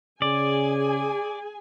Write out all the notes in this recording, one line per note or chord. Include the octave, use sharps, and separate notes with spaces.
C#3 G#4 D5 G#5